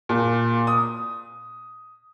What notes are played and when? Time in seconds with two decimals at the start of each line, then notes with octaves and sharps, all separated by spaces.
0.09 A#2
0.67 D#6